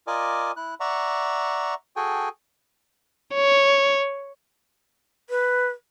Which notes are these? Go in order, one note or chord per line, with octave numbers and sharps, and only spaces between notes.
F4 A#4 D5 D#5 G#5 D6
E4 F#6
D5 E5 F#5 A#5 C#6
F#4 G#4 A4 G5 G#5
C#5
B4